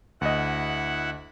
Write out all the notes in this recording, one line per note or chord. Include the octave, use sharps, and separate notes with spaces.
D2 E4 D#5 F#5